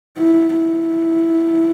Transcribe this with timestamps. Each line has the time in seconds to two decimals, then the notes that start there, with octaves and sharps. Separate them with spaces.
0.18 E4
0.60 E4